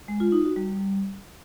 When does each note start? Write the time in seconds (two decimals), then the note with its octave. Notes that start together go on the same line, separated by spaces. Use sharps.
0.08 G#3
0.20 F4
0.32 D#4
0.44 F#4
0.56 G3